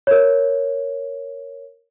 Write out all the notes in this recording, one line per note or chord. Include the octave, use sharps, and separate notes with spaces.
A#4 C#5